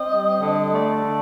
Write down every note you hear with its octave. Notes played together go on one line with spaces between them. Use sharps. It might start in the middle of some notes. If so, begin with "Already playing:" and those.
Already playing: C4 D#5
G3
D3
A3 D5
D3